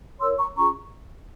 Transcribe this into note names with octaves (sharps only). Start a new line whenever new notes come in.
E4 A#4 C#5 C6 E6
A#5 C#6
C#4 F4 G#4 A#5 C#6